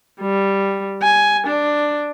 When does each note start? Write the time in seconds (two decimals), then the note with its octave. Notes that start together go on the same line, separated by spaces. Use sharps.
0.21 G3
1.02 G#5
1.47 D4